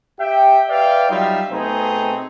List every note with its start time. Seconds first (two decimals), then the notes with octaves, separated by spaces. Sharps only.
0.19 G4 E5 G5
0.69 B4 D5 E5 F5 G5
1.10 F#3 G3 D#4 F4 E5
1.50 B2 A3 C4 D#4 G#4